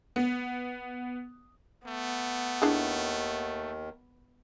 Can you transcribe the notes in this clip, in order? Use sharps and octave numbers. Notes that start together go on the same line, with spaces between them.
B3
A3 B3
D#2 D#3 D4 E4 G#4